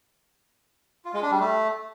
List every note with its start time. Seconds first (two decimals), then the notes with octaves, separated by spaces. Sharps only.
1.05 F4
1.14 G#3
1.22 D4
1.31 G3
1.40 A3